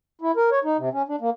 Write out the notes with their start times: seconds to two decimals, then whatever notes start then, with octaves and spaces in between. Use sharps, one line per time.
0.21 E4
0.37 A#4
0.52 C#5
0.64 D#4
0.78 C3
0.93 C#4
1.08 D4
1.21 A#3